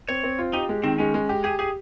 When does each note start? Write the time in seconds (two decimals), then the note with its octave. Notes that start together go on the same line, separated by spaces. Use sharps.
0.09 C4 C#5
0.24 C4
0.39 F4
0.53 D#4 G4
0.69 G#3
0.83 D#3 C4
0.99 G#3 C#4
1.14 G#3
1.29 G4
1.44 G4 G#4
1.59 G4 G#4